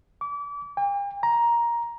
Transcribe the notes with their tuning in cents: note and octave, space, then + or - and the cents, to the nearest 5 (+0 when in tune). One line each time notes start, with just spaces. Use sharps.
D6 -35
G5 +45
A#5 +10